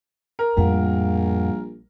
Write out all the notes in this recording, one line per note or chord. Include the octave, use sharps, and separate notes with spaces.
A#4
A#1 F2 A2 G3 F5 F#5